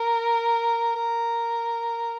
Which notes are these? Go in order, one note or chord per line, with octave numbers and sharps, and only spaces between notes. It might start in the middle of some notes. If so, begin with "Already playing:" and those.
Already playing: A#4
A#4